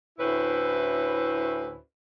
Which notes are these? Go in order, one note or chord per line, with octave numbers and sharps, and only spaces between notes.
D2 A2 C#4 E4 B4 C5